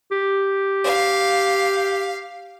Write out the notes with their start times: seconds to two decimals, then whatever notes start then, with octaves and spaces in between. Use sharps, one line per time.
0.11 G4
0.84 F5